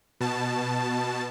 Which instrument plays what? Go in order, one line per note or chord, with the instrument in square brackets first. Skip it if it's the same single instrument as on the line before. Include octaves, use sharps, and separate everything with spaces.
[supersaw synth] B2 A5